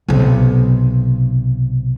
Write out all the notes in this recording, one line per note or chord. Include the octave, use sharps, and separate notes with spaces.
B1 C3